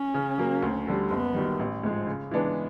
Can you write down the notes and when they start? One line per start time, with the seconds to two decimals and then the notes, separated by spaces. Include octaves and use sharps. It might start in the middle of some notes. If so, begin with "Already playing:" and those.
Already playing: C#4
0.14 C#3
0.38 F#3 A#3
0.62 D2
0.87 D3 G3
1.10 F#1 B3
1.34 F#2 D#3 G3
1.59 A1
1.83 G#2 F3 G#3
2.07 C#3
2.31 E3 G#3 B3 D4